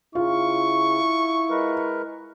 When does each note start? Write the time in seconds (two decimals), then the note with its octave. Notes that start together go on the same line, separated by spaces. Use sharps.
0.15 C#3 E4 F4 C#6
1.50 G#3 A#4 B4